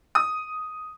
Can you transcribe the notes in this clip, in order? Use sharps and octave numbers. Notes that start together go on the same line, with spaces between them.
D#6